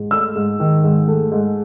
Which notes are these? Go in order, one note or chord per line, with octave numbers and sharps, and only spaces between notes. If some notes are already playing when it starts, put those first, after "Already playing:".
Already playing: G#2
A3 E6
G#2
D#3
G#2
A3
G#2